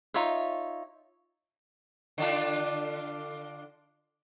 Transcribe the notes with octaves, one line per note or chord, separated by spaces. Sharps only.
D#4 F4 C#5 E5
D3 D4 F4